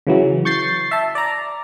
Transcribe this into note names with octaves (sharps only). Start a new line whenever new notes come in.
C#3 E3 F#3
C#6 G6 A6 C7
E5 A5
D5 A#5